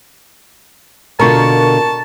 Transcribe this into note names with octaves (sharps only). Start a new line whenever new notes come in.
B2 D3 F4 A#4 A5 C#6